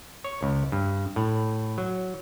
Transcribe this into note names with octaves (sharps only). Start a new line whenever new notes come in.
C#5
C#2
G2
A2
F#3